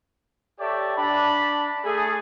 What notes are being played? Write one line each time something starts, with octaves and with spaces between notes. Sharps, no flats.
G4 A4 C#5 D5 E5 G5
D4 A5 B5
A3 G#4 A4